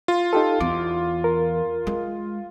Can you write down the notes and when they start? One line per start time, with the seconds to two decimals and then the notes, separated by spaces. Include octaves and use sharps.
0.08 F4
0.33 D#4 G4 A4
0.61 E2 D6
1.24 A#4
1.87 G#3